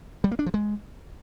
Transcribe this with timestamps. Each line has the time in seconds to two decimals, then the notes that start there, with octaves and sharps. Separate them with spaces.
0.24 G3
0.31 A#3
0.39 D4
0.46 F3
0.54 G#3